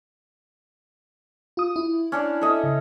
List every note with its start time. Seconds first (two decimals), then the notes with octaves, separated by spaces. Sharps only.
1.57 F4 D#6
1.76 E4
2.12 C#4 D4 D5
2.41 A4 D#5 E5
2.64 C#3